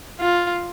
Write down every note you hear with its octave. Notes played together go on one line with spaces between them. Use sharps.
F4